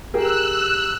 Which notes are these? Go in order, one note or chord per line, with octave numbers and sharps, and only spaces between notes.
G4 G#4 A#4 E6 F#6